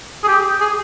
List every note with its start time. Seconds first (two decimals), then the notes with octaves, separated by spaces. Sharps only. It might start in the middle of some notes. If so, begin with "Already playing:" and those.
0.23 G#4
0.28 G4
0.61 G#4